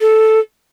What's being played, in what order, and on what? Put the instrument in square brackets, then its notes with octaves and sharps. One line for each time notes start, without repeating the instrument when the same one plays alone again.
[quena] A4